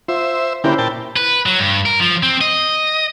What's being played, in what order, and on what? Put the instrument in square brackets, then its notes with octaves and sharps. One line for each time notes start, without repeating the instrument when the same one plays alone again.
[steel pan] F4 [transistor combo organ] C5 E5
[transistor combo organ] D3 A#3 G4 [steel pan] C#4 E4 C5
[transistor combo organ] A#2 G5 A5
[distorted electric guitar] B4
F#3
G2
A#4
F3
C4
D#5